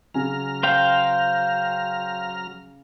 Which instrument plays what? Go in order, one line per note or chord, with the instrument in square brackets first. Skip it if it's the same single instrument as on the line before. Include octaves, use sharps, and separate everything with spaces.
[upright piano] C#3 G#5 [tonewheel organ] F#3 A#5 F6
[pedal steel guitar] C5 F5 G5